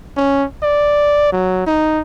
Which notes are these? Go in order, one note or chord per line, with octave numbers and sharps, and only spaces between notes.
C#4
D5
F#3
D#4